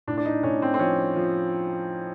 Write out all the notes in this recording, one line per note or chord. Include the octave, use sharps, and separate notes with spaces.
A2 D4
D4
D#4
A2 C#4
C4
C4
F3 C#4
F3